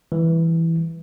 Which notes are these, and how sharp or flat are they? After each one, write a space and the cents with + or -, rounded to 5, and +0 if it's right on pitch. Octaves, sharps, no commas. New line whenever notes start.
E3 +0 G3 +0